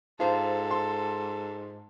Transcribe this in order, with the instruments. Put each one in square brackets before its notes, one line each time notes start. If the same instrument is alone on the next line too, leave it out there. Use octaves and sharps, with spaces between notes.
[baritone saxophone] G#2 [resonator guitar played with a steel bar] F4 C5 [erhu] A4 [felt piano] A5
[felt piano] C6